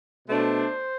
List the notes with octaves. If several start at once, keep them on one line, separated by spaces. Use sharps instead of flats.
B2 A3 D4 C5